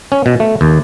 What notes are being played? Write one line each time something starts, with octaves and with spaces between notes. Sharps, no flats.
C#4
B2
A3
D#2